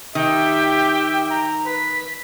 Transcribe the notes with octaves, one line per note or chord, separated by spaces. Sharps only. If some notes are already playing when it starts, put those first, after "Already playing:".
D#3 G4 E5 G5
A#5
B4 B6